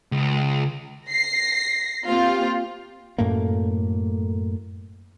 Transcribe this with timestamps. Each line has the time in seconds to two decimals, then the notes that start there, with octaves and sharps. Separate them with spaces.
0.12 C#2
1.08 A#6 C7
2.07 A#3 C4 F4 G4
3.18 F#2 A2 A3 A#3